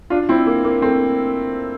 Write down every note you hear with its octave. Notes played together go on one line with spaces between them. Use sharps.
D4 F4
C4 E4
A#3
A#3
A3 C4